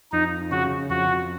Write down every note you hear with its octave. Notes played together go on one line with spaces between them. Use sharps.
F2 D#4
C#3 F#4
F2 F#4